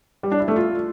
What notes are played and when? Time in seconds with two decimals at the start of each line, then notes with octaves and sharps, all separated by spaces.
0.23 G3
0.32 D4
0.40 E4
0.48 A3
0.56 F4